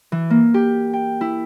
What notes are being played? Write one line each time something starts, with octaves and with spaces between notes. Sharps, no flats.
E3
A#3
G4
G5
E4